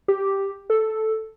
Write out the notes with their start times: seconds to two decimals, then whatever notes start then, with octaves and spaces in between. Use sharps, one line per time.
0.08 G4
0.70 A4